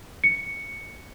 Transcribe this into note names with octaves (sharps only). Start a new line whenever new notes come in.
C#7